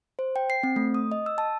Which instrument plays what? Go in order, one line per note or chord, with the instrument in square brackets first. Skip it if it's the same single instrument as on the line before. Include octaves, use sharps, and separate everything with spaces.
[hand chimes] C5
G5
C7
C4
A3
D#6
D#5
E6
A5